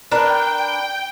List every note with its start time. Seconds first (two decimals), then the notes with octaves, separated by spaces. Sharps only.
0.11 D4 A#4 B4 G5